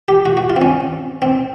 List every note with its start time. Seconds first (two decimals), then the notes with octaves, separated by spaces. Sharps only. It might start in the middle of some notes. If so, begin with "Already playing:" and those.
0.08 G4
0.26 F#4
0.37 F#4
0.50 F4
0.56 C4
0.61 C#4
1.22 C4